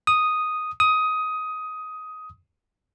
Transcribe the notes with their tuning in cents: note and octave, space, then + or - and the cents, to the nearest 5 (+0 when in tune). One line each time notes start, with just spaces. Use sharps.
D#6 +0
D#6 +15